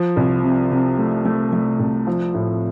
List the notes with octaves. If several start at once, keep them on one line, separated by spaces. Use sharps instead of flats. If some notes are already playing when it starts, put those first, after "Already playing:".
Already playing: F3
C2
C3
C3
A3
A3
A3
C2
F3
A2